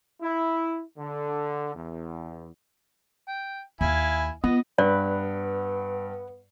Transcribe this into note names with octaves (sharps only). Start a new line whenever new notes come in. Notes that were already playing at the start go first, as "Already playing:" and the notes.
E4
D3
E2
G5
D#2 E4 F5 G#5
B3 F4 D#5
G2 B3 B4 D5